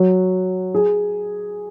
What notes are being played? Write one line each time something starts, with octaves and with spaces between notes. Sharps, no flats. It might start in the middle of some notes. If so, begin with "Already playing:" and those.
Already playing: F#3 F#4
G#4